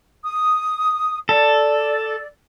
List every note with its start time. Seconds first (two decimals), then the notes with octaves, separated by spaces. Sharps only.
0.24 D#6
1.29 A4 D5